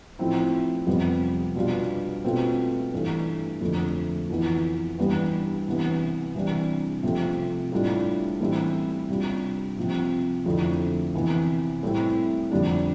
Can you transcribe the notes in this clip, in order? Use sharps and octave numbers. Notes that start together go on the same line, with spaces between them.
A2 F3 C4 E4
F2 C3 G3 B3
B2 G3 D4 F4
B2 A3 C4 F4
G2 E3 A3
F2 D3 A3
F2 E3 B3 E4
G2 E3 G3 B3
C3 E3 B3
C3 E3 G3 D4
C3 F3 A3 C4
A2 G3 D4 F4
A2 E3 G3 C4 E4
C3 G3 D4 F4
C3 F3 C4
F2 D3 A3 C4 E4
C3 E3 B3
A2 G3 C4 E4
F2 D3 G3 D4